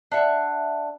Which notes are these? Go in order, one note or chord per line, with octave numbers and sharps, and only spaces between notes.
D4 E5 F#5